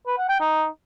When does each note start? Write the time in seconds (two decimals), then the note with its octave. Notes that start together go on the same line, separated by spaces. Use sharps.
0.07 B4
0.18 F#5
0.29 G5
0.40 D#4